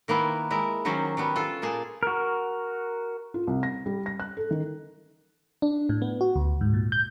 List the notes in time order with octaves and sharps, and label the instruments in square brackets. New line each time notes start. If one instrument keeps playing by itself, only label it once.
[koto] D#3 A#3 B3 E4
G#3 E4 A#4
D#3 F#3 A#3 C#4 C5
F#3 G3 B3
F4 A4
A#2 A#3 G#4 G#5 A5
[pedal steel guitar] F#4 A#4
[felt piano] F4
C2
A#6
G3
A#6
F#6
A4
D#3
[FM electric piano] D4
A2
B3
F#4
D2
G#2
A#2
G6